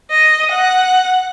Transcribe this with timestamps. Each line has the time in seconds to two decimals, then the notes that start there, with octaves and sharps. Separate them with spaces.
0.11 D#5
0.51 F#5